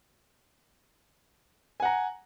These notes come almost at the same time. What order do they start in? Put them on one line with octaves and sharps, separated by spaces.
G#5 F#5 A#5